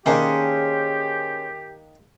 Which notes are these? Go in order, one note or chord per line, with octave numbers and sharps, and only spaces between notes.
D#3 A#3 C#4 D4 G4 G#4 C5